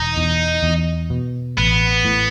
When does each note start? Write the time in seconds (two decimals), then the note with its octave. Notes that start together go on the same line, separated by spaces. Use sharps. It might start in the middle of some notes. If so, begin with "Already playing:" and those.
Already playing: E1 D#4
0.17 E2
0.63 E2
1.10 B2
1.58 A1 B3
2.05 A2